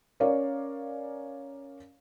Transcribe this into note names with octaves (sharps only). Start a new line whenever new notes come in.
C#4 A#4 C#5 D5 F5